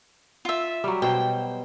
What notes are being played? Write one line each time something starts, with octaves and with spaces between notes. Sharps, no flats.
F4 E5
F#3 G3
B2 C5 G5